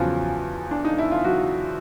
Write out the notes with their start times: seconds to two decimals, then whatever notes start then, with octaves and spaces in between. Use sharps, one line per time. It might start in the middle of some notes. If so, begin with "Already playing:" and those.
Already playing: E2 C#3 F3 F#3 F4
0.71 D4
0.84 D#4
0.98 E4
1.11 F4
1.25 F#3 F#4